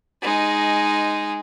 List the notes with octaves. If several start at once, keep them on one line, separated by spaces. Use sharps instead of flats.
G#3 D#4